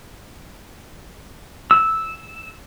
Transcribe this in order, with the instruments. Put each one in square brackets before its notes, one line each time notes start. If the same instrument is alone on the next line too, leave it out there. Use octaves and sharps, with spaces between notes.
[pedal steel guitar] E6